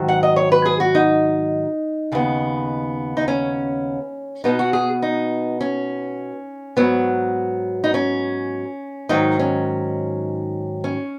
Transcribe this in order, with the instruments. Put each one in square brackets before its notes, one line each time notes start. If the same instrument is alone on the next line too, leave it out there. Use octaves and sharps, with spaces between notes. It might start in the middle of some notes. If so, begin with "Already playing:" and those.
Already playing: [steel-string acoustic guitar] G#2 D#3 F#3
F#5
D#5
C#5
B4
G#4
F#4
D#4
D#2 C#3 B3
D#4
C#4
B2 B3 D#4
F#4
G#4
D#4
C#4
G#2 F#3 B3
D#4
C#4
G#2 D#3 F#3 D#4
C#4
C#4